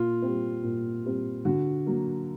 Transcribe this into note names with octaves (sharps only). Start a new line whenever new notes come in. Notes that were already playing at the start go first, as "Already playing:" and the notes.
Already playing: A#2 F4
G3 C4
A#2
G3 C4
D3 F#4
F#3 A#3